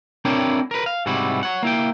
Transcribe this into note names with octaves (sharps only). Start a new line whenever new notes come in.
C4 D4 E4 A#4 C#5 G5
A#4 B4
F5
G#2 C3 G3 G#3 E4 F#4
C#5 F#5
A#3 E4 G5